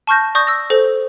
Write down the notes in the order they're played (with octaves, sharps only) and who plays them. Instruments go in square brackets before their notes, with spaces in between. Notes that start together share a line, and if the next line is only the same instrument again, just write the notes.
[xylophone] A5 C#6 F6 G6 A#6
D5 C#6 D#6 G6 A#6
E6 A#6
A4 C5